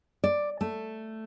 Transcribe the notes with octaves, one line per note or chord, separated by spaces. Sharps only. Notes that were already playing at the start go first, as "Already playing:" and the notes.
D5
A3